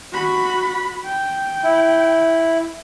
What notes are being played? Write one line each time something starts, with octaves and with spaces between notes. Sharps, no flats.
F#4 B5
G5
E4